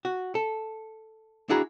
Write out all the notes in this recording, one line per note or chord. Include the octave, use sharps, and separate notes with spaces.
F#4
A4
D4 E4 F#4 G#4 A#5 B5